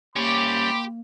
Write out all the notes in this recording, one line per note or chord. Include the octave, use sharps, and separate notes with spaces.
G3 A#3 C#4 G4 C5 B5 D6